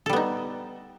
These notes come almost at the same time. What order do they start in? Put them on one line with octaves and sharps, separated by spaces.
A4 G3 B3 D#4